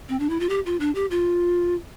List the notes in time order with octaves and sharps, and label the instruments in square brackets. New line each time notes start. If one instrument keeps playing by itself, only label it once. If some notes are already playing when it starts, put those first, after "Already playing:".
[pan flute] C4
D4
E4
F4
G4
F4
D4
G4
F4